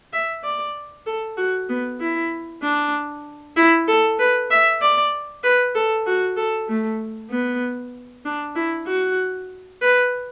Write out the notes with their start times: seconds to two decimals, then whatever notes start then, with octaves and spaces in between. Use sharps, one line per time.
0.13 E5
0.44 D5
1.06 A4
1.37 F#4
1.69 B3
2.01 E4
2.63 D4
3.57 E4
3.88 A4
4.19 B4
4.51 E5
4.82 D5
5.44 B4
5.75 A4
6.06 F#4
6.37 A4
6.69 A3
7.30 B3
8.25 D4
8.55 E4
8.87 F#4
9.81 B4